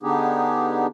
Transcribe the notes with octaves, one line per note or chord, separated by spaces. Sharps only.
D3 B3 D4 D#4 G4 G#4